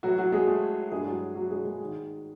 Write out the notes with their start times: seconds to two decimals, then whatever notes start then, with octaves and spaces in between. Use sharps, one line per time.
0.03 A2 E3 F#3 F#4
0.18 F#3 F#4
0.32 G#3 G#4
0.47 A3 A4
0.91 G2 E3 G#3 G#4
1.06 F#3 F#4
1.35 F#3 F#4
1.50 G#3 G#4
1.65 G#3 G#4
1.80 G#2 D#3